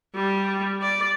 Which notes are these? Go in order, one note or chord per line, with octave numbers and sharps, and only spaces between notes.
G3
D5